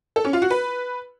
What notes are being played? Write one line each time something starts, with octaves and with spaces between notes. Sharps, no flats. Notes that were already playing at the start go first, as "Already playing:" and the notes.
A4
C#4
F4
F#4
B4